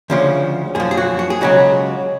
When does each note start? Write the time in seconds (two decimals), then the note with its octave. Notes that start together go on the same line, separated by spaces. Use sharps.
0.10 D2 C#3 F3
0.75 F#2 F3 G#4
0.91 G#4
0.98 F#4
1.19 F#4
1.30 G#4
1.41 C#2 C#3 F#3 F#4